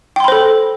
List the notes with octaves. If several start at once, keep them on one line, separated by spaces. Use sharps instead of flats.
A4 C5 G5 B5 C6